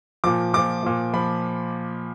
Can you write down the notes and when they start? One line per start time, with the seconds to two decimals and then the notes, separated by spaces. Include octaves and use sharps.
0.24 A#2 F3 D6
0.53 A#2 F3 D6
0.83 A#2 F3
1.14 F3 B5